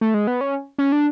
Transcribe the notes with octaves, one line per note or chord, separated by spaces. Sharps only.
A3
G#3
B3
C#4
C#4
D4